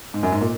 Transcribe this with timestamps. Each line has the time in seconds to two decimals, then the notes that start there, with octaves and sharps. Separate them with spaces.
0.14 G#2
0.23 F#2
0.32 G#2
0.41 A#2